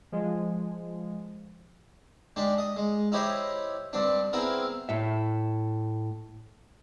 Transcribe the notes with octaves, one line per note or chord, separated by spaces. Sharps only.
F3 G#3
G#3 D4 G4
D#5
G#3
D#4 E4 G4 C5 C#5 D#5
G2 C4 D4
B3 C4 E4 G#4 A#4
A2 E5